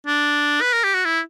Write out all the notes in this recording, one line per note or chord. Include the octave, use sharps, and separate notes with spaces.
D4
B4
A#4
G4
F#4
E4